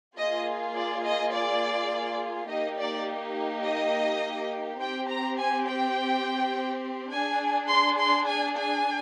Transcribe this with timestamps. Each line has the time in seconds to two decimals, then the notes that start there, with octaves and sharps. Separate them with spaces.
0.17 A#3 F4 G#4 D#5
0.76 D5
1.04 D#5
1.33 D5
2.49 A#3 D#4 G4 D#5
2.77 D5
3.65 D#5
4.80 C4 G4 G5
5.09 A#5
5.38 G#5
5.67 G5
7.12 D4 G#4 G#5
7.69 C6
7.99 C6
8.27 G#5
8.57 G#5